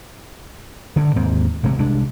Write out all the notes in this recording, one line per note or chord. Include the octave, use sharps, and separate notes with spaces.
D2 G2 D3
D#2 G#2 A#3 C4
G#1 C3 G#3 A3
C2 G#3 D4